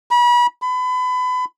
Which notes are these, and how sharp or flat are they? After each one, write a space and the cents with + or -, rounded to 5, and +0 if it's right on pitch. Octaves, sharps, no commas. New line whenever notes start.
B5 -35
B5 +30